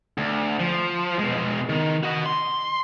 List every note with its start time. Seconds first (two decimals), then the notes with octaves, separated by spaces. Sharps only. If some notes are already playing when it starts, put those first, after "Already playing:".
0.18 D2
0.59 F3
1.19 B2 G#3
1.69 D#3
2.03 F#4 D#5
2.26 C6